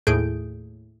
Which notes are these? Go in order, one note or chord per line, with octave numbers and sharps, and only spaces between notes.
D#2 A2 G#4 G6 D7